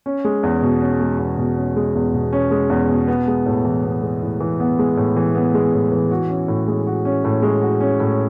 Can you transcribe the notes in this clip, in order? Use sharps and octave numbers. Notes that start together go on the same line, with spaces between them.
C#4
G#3
E2
B2
C#4
G#3
E2
B2
C#4
G#3
E2
B2
C#4
G#3
E2
B2
B3
G#3
A2
E3
B3
G#3
A2
E3
B3
G#3
A2
E3
B3
G#3
A2
E3
F#4
C#4
A2
G#3
F#4
C#4
A2
G#3
F#4
C#4
A2